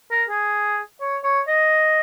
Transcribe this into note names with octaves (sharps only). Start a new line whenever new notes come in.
A#4
G#4
C#5
C#5
D#5